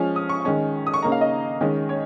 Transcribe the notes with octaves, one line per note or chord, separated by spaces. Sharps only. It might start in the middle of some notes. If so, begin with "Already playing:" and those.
Already playing: F3 G#3 C#4 F6
D#6
C#6
D#3 G#3 C#4
D#6
C#6
C#3 A#3 D#4 A#5
F5
D#5
D#3 G#3 C#4
C#5